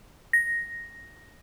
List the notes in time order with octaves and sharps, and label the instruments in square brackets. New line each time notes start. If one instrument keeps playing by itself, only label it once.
[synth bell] A#6